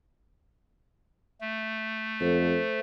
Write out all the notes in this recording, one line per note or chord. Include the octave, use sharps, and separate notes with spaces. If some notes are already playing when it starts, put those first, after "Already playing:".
A3
F2 A4 C5